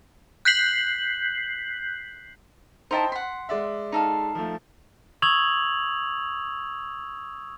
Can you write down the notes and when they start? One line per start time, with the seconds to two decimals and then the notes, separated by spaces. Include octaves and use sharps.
0.45 F#6 G6 B6 C7 F#7
2.91 D#4 E4 C5 D#5 G5 A5
3.12 F#5 C6 B6
3.49 G#3 D5 E5
3.92 D#4 A4 F5
4.35 F3 A3
5.22 C#6 D#6 E6 G#6 F7 F#7